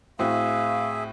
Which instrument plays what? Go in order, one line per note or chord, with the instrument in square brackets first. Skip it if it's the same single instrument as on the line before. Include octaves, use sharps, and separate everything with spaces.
[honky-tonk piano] A2 C4 F#4 [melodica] G#4 E5 [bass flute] F5